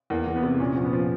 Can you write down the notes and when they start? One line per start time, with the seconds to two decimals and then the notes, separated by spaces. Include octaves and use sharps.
0.10 E2 A#3
0.27 E2
0.36 B3
0.43 C3
0.60 A#2 C#4
0.76 F3
0.85 B3
0.93 F3